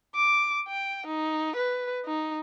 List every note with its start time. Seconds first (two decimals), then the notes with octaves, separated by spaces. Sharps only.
0.15 D6
0.68 G5
1.07 D#4
1.56 B4
2.06 D#4